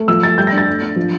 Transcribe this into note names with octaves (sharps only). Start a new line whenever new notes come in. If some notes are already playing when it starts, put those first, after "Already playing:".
Already playing: A3
F3 E6
A3 A6
G3 G6
A#6
D4
A6
A3
D4
F3